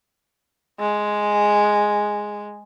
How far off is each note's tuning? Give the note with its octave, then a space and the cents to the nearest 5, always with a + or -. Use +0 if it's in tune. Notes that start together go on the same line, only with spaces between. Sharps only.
G#3 +0